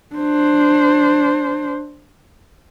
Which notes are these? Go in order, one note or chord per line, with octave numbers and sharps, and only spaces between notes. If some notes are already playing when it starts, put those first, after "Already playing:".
D4 C5